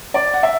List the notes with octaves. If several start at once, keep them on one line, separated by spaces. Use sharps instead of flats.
D5
F#5
E5